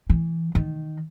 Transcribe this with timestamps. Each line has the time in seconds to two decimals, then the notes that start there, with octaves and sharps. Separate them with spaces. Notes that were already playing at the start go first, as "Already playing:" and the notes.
0.10 E3
0.55 D#3